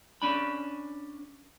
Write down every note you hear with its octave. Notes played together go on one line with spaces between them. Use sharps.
C#4 D4 B5